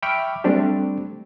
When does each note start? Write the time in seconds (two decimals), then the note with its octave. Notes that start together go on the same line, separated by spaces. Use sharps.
0.02 E5 G5 B5 C#6 D6 F6
0.44 G3 A3 C4 D4 G4